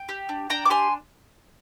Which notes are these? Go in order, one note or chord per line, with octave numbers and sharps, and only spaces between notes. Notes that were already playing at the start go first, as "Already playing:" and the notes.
Already playing: G5
G4
D4
D4 G5 A#5
D6
G4 G#5 C6